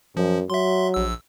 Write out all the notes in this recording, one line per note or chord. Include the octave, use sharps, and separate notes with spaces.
F#2 F3
F#3 E5 C6
A#1 E6